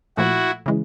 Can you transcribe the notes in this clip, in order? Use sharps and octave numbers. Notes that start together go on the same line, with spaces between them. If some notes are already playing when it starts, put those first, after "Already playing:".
A#2 F3 A3 E4 F#4
C#3 E3 G#3